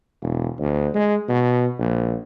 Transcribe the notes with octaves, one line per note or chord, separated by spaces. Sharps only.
E1
D2
G#3
B2
A#1